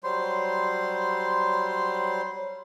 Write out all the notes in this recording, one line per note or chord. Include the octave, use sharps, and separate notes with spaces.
F#3 G3 C5 C6